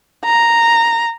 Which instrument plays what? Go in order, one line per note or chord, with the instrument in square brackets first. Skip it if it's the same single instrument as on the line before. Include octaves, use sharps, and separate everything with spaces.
[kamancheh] A#5